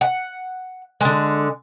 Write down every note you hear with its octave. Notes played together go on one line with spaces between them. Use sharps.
F#5
D3 G#3